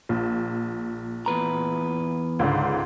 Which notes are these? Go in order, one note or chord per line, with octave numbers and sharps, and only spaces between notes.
A#1
E2 B4 A#5
C#2 G#2 D3